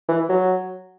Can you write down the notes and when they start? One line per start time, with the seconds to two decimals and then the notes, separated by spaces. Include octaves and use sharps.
0.09 E3
0.29 F#3